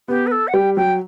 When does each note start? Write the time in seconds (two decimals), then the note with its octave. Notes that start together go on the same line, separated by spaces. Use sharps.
0.08 B3 G4
0.26 B4
0.31 A4
0.47 F#5
0.54 G3 G5
0.76 F#3 G5